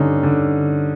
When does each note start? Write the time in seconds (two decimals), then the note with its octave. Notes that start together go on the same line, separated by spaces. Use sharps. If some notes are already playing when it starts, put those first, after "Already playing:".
Already playing: G2 D3 C#4 D#4
0.23 D3